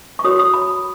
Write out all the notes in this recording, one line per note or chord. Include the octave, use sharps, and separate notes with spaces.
C#6
F#4 A#4 C#5 D#6
D#6
B5